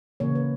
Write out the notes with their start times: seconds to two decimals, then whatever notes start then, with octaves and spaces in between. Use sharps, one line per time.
0.20 C#3 E3 A#3 C#5
0.35 B4